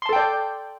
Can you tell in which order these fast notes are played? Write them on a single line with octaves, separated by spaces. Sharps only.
C6 A5 A4 G5 D5